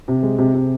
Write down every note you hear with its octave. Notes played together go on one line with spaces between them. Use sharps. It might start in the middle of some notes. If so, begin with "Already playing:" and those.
C3
G#3
C3
C3